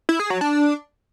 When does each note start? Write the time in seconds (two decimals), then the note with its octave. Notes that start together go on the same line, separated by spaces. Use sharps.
0.09 E4
0.20 G#4
0.30 F#3
0.41 D4